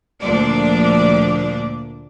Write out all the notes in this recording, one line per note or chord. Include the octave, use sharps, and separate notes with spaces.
D2 A#2 F3 D4 D5